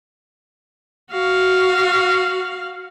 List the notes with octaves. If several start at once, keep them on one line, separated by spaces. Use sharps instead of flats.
F#4 F5